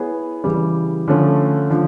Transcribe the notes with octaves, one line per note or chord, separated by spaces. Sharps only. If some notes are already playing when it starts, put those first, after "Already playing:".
Already playing: B3 E4 G#4 C#5
C#3 E3 G3
D3 F3 A3 C#4
D3 F3